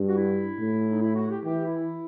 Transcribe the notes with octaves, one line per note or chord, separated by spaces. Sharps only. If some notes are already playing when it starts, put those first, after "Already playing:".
Already playing: G2
F#4
E4
A2
D#4
E4
F#4
G4
E3 G4
E4